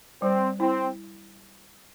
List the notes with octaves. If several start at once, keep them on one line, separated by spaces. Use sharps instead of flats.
G3 C4
C4 E4